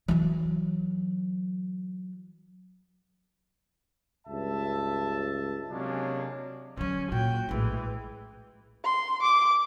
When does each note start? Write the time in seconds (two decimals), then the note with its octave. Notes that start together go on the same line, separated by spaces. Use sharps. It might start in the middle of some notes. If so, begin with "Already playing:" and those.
0.08 E3 F#3
4.27 C#2 G2 E5 A5
5.70 C3 F#3 G#3 A#3 C#4 D4
6.77 D3 F#3 C#4
7.12 A#2 F#4 G5
7.49 A#1 A2 E3 G#3
8.84 C6
9.22 D6